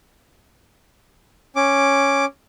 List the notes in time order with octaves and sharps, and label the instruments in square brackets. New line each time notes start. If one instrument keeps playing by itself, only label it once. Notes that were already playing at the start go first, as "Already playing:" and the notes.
[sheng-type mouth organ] C#4 D6